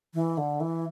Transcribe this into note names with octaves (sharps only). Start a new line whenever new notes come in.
E3
D3
E3